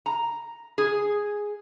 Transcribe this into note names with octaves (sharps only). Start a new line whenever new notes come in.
A#5
G#4